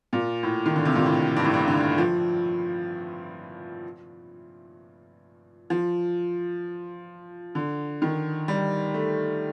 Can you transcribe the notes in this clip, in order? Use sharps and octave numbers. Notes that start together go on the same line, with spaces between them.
A#2
A2
D#3
D3
C3
A#2
A2
G2
A2
G2
D3
F3
F3
D3
D#3
G3
A3